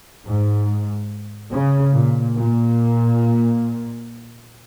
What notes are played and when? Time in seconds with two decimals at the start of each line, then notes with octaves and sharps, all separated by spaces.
0.25 G#2
1.51 C#3
1.94 A#2
2.36 A#2